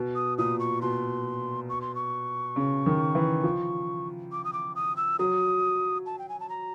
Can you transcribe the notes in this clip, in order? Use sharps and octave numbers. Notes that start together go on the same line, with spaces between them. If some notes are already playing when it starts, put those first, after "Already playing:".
Already playing: B2
D#6
A#2 D#6
C#6
B2 C6
C#6
C6
C#6
C#3
D#3
E3
F3
D6
D#6
D6
D#6
E6
F#3 D#6
A5
G5
G#5
A5
A#5